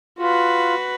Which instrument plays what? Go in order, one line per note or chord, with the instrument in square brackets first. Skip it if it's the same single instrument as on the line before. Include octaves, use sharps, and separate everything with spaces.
[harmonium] F4 [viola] F#4 B4